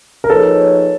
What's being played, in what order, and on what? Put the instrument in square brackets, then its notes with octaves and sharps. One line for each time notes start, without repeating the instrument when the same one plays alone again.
[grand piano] A#4
[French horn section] F3 A#3 D#4 G#4 C#5 [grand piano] A4 B4